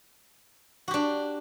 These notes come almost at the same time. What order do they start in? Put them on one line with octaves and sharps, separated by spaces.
F#4 G4 D4